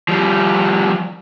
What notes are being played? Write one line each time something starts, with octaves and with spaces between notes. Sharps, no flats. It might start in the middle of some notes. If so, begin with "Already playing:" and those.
F3 G3